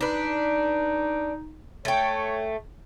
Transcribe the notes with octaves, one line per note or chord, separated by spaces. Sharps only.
D4 D#4 B4
A3 C#5 G5